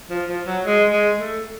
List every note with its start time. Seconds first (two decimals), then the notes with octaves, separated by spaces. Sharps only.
0.09 F3
0.28 F3
0.46 F#3
0.64 G#3
0.91 G#3
1.18 A3